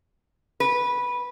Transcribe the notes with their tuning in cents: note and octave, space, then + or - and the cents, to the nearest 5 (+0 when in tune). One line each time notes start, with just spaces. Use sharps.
B4 -10